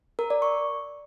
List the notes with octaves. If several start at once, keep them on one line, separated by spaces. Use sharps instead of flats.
A#4
D5
C#6